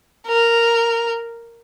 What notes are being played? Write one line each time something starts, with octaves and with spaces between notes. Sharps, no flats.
A#4